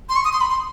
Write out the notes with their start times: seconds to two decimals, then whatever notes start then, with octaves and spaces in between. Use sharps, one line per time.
0.09 C6
0.16 C#6
0.25 D#6
0.33 C6
0.41 B5
0.50 C6